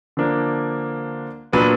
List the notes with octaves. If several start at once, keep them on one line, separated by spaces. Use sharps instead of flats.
D3 F3 A#3 D4
A#2 F#3 B3 D4 B4